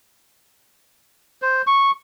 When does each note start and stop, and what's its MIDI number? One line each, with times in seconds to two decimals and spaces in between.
1.42 1.62 72
1.67 1.91 85